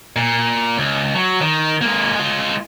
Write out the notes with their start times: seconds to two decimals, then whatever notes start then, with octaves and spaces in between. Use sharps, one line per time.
0.16 A#2
0.77 C#2
1.15 F#3
1.41 D#3
1.81 G#3 A#3
2.16 G#3 F4